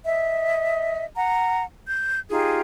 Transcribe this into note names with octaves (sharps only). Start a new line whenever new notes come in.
D#5 E5
F#5 A#5
G6
D#4 F4 G4 G#4